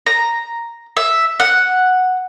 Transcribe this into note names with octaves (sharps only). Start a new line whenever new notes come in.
A#5
E5
F#5